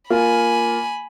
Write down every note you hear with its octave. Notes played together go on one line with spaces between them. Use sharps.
A#3 F4 G#5 B5